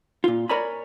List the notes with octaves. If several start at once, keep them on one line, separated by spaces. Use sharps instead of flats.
A#2 F4
A#4 C#5 D5 G#5 A#5 B5